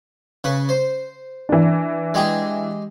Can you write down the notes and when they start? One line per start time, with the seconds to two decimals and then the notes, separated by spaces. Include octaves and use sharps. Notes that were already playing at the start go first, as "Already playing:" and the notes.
0.44 C#3 B4
0.69 C5
1.49 E3 D4
2.14 G#3 G4 G#4